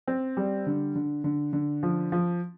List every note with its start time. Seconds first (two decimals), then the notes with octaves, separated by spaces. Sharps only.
0.07 C4
0.37 G3
0.66 D3
0.95 D3
1.24 D3
1.53 D3
1.83 F3
2.12 F3